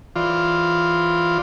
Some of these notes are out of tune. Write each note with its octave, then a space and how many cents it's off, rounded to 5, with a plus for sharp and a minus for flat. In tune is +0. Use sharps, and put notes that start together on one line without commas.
E3 +0 F4 +0 D5 +0